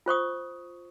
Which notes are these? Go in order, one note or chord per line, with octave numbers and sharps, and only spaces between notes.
F4 C5 C#6 D#6